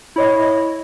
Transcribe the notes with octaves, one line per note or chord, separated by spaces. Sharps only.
E4 C#5 D#5